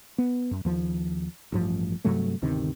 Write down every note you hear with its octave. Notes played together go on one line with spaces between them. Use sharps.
B3
F#2
D#2 F3
A1 G2 F3
G2 C3 F#3 A3
G1 D2 C3 D#3